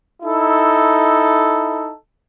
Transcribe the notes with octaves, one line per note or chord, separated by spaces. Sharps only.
D#4 E4 A4